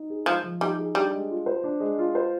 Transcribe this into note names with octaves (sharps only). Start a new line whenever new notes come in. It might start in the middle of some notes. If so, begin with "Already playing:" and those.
Already playing: D#4
G#4
F3 G#3
F3
G3 D#4
G#4
G3 D4
G#3
F4
C5
D4
G#3
F4
C5